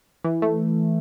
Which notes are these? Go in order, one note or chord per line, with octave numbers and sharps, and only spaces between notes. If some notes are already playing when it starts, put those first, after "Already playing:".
E3
A3